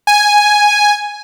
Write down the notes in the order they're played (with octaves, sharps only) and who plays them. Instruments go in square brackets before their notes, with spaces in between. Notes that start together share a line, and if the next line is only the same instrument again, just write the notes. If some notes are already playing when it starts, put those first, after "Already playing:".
[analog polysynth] G#5